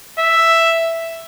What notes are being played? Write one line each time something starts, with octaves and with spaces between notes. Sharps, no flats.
E5